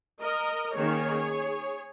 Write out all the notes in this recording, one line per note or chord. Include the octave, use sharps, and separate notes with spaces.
A#4 D#5
D#3 A#3 C#4 G#4 C#5